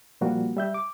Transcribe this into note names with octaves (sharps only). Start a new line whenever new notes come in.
A#2 F3 G3 A#3 F#4
G3 E5 G6
D6